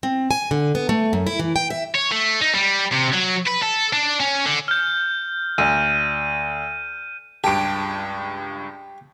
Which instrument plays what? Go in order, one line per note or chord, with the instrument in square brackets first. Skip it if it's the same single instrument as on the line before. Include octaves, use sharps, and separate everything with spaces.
[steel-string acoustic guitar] C4
G#5
D3
B3
A3
F#2
E4
E3
G5
E5
[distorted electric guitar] C#5
A3
D#4
G3
C3
F#3
B4
A4
D4
C#4
D3
[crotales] F6 G6
[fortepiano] D2 [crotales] D#7
[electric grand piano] C#2 G2 [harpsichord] G4 [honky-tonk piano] A5 D7